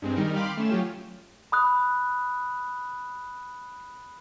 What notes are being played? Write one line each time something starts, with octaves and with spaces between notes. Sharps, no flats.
G2 G#3 C4
D#3 G3 D#4 A#4
F5 G5 B5 C6 D6 F6
A3 C#4 E7
F#3 C#4 F4 G4
B5 D#6 F#6